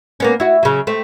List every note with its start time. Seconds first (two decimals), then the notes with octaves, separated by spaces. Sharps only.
0.20 A#3 B3 C#4
0.40 E4 F#4
0.63 C#3 F#3
0.87 A3 C4